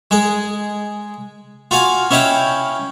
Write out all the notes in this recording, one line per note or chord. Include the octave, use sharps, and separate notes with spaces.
G#3 G#4
F4 F#4 F5 G#5
C#4 E4 D#5 F5 G5